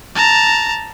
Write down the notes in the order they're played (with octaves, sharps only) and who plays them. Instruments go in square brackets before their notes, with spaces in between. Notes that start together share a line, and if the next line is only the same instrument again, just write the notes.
[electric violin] A5 A#5